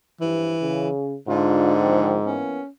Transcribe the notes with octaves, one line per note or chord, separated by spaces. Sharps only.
G2 E3 F3
C#3
G#2 D3 D4 F4
G#1 F3 C4
E3 A#3 B3 C#4